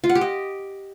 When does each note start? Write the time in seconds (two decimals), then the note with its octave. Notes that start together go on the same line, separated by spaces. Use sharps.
0.04 F4
0.10 F#5
0.15 G4
0.21 D#5